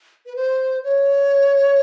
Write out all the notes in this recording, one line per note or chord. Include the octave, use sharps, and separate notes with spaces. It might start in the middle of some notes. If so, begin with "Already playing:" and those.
B4
C5
C#5